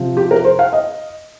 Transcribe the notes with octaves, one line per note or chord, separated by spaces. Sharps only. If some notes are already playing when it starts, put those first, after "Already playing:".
Already playing: C3 F3
G4
A#4
C5
F5
D#5